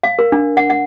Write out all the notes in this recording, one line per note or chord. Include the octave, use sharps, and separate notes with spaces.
F5
A#4
D4
F#5
F#5